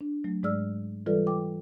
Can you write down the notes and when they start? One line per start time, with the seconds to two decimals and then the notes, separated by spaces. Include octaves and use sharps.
0.01 D4
0.24 F#3 A3
0.43 G#2 G#3 G#4 D5 E6 F6
1.06 E3 G3 F4 A4 B4 D5
1.27 G5 D6